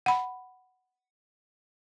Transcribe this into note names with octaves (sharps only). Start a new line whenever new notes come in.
F#5 B5